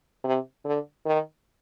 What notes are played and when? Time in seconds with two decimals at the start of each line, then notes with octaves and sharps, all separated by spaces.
0.24 C3
0.65 D3
1.06 D#3